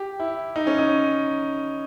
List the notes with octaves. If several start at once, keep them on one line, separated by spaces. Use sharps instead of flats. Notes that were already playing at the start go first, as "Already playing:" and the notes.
Already playing: G4
E4
D#4
C#4
D#4